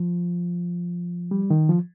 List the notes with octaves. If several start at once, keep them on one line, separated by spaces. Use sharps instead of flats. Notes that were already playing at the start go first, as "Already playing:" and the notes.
Already playing: F3
G3
D#3
F3